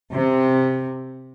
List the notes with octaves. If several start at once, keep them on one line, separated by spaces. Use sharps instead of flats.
C3